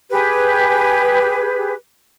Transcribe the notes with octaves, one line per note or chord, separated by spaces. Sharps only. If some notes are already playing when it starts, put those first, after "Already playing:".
G4 G#4 B4